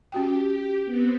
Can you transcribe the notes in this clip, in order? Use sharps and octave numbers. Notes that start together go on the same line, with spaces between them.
C#4 F#4 G4 G5
B3 C4